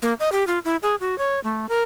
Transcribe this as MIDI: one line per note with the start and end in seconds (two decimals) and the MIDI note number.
0.02 0.13 58
0.20 0.32 75
0.32 0.46 67
0.47 0.59 65
0.65 0.76 64
0.83 0.95 68
1.00 1.18 66
1.18 1.40 73
1.44 1.66 57
1.69 1.83 70